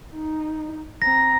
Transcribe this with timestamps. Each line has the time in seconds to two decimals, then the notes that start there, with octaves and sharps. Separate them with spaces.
0.13 D#4
1.02 C4 A#5 A#6